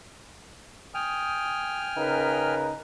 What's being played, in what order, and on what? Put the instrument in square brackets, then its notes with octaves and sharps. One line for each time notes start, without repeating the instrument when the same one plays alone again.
[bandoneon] G5 G#5 F6 [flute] D#6
[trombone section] C#3 D#4 A#4 [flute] B4